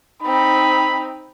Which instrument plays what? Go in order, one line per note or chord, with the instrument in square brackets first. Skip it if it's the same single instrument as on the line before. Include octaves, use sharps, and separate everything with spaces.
[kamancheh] C4 D#4 [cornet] B5